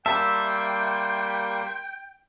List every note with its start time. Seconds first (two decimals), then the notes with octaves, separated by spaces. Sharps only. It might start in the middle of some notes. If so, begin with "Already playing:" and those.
0.06 G3 A#3 E5 G5 A5 C6